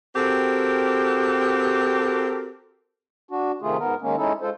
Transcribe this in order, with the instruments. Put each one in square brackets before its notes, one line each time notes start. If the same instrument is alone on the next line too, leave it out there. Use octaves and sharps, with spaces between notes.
[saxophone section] C4 F#4 G4 A4 A#4
[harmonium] D4 F#4
C3 D#3 A3 F4 G#4
G#2 B3 A#4
D#3 G#3 A#3 C#4
G#3 C#4 D#4 E4 A4
G#3 F4 A4 C5